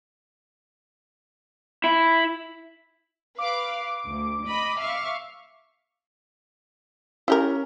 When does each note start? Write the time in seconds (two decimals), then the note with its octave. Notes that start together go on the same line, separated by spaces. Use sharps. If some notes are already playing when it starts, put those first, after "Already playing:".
1.84 E4
3.39 B4 F5 D6
4.08 D2
4.47 D#5 B5
4.79 E5 F5 C#6
7.28 C#4 E4 G4 A#4